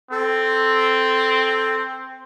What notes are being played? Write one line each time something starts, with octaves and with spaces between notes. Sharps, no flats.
C4 A4